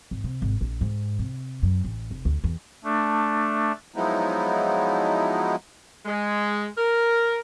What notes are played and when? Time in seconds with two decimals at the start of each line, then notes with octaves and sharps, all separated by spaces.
0.11 G#1
0.24 C3
0.42 G#1
0.61 A#1
0.81 G#2
1.19 C3
1.63 F#2
1.84 A1
2.11 F1
2.25 D2
2.44 E2
2.84 A3 D4
3.96 F3 F#3 G#3 B3 D#4 E4
6.06 G#3
6.78 A#4